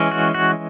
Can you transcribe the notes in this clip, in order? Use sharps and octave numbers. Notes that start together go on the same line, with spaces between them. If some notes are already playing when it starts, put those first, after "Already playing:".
Already playing: E3 G#3 C#4
F#4
F#4